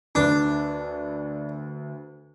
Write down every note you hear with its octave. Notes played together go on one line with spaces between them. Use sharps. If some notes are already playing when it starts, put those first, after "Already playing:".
D2 D4 B4